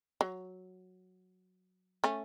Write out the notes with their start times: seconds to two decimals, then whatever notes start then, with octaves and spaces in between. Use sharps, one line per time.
0.21 F#3
2.04 A3 C#4